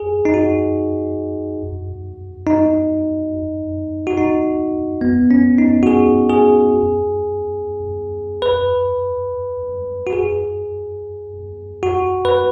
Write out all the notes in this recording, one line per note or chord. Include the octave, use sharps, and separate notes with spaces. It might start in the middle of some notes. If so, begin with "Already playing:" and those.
Already playing: G#4
D#4
F#4
D#4
F#4
D#4
B3
C#4
D#4
F#4
G#4
G#4
B4
F#4
G#4
F#4
B4